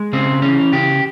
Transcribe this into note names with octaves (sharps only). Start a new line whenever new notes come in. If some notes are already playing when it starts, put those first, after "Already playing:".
Already playing: G#3
C#3 C4
E3 C#4
C#3 G4